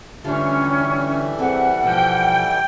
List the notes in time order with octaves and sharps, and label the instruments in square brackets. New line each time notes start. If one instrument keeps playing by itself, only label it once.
[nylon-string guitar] D3 F4 [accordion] E3 G3 A3 [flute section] C#4
[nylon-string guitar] C4 G#4 A4 [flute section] F#5
[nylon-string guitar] B2 F3 [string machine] G5